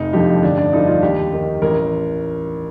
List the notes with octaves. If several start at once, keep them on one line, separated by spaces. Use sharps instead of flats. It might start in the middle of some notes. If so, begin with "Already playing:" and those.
Already playing: F1 D#4
F2 D3 F3 G4
G1 D4
D4
G2 D3 F3 D#4
F4
D#2 G4
D#3
A1 A#4